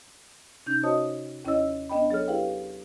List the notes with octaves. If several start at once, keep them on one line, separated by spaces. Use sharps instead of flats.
C3 C#4 D#4 G6
F#4 C5 C#5 D#5 A5 D#6
D#2 C#4 E4 C#5 D#5 E6
B3 D4 D#5 G5 B5
F#3 G#4 A4 C#5 F6
E4 G4 G#4 B4 F5 G5